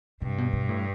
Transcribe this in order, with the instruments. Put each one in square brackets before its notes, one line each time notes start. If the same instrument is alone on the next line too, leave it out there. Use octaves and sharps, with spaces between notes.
[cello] G2 [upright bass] C3
[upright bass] B2
B2
A2